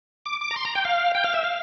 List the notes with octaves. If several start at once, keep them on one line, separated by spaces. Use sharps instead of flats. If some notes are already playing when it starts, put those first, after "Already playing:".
D6
D6
A#5
C6
A#5
G5
F5
G5
F5
E5
F5